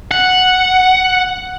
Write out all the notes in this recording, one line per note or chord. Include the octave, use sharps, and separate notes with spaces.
F#5